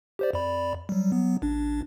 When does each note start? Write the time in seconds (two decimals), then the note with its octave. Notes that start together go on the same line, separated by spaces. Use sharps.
0.19 G4 C5 D5
0.33 F2 D5 B5
0.89 F#3 G3
1.12 F#3 B3
1.42 A1 D4